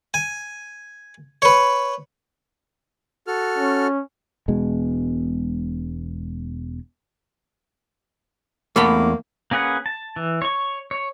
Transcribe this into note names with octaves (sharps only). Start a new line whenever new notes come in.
G#5
B4 C#5
F#4 A4 F6
C#4
E1 B2 G#3
E2 A3 A#3 B5
A#3 C#4 G#4 B4 F#5
A5
E3
C#5 C#6
C#5